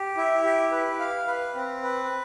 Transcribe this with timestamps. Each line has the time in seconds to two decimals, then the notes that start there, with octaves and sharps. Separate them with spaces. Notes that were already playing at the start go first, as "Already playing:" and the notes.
Already playing: G4
0.17 E4
0.44 G4
0.72 B4
0.99 F5
1.27 B4
1.55 C4
1.83 B4